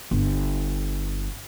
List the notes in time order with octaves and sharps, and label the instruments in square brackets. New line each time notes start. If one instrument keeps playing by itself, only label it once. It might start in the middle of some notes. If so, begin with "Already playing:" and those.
[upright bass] G1